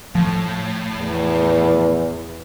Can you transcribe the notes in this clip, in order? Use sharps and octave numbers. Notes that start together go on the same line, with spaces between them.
A2 F3
E2